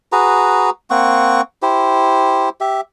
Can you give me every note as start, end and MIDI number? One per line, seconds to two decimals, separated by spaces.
0.12 0.70 66
0.12 0.70 68
0.12 0.70 71
0.12 0.70 82
0.90 1.41 58
0.90 1.41 60
0.90 1.41 78
0.90 1.41 85
1.62 2.49 64
1.62 2.49 67
1.62 2.49 72
2.61 2.81 67
2.61 2.81 76